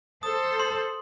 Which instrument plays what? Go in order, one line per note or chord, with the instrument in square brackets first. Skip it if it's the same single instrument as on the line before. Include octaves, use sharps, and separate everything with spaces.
[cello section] A4 C5 [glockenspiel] D#6
[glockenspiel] C6